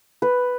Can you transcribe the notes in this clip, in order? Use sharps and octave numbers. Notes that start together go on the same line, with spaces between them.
B4